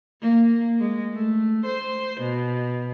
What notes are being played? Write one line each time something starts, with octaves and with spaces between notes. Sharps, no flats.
A#3
G#3
A3
C5
B2